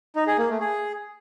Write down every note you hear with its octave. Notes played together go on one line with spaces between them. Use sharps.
D#4
G#4
A#3
A3
G#4